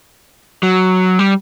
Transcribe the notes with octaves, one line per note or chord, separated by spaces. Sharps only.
F#3
G3